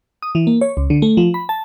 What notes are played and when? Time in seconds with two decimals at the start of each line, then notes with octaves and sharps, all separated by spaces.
0.22 D#6
0.35 E3
0.47 A#3
0.61 C#5
0.77 C#2
0.90 D3
1.02 A3
1.17 F3
1.34 B5
1.49 A5